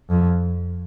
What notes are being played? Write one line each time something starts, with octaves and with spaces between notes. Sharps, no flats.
F2